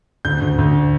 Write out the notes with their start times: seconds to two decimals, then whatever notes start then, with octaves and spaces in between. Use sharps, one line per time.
0.25 D2 G6
0.41 D2
0.59 D2